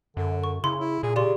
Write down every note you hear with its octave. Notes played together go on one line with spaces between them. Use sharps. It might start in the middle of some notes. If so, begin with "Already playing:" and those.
F#2 D3
C#6
C#3 E4 C6
E4
A#2 G#4
C#3 G4 D5 C6